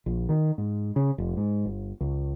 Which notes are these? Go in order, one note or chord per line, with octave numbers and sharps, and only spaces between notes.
A#1
D#3
G#2
C#3
F1
G#2
G1
C#2